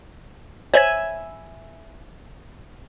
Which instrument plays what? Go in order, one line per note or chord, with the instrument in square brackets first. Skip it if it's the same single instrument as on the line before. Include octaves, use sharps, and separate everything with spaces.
[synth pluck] C5 C#5 G#6 [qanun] E5 G#5 B5